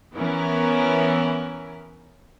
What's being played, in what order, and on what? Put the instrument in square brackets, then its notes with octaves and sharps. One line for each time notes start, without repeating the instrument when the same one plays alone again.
[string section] E3 B3 C#4 E4 A#4